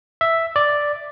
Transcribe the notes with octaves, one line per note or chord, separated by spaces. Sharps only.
E5
D5